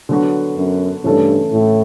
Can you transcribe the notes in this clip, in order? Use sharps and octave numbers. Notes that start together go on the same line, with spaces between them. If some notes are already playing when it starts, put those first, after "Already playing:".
D3 F#3 B3 F#4
F#2
G2 C#3 E3 A3 E4 A4
A2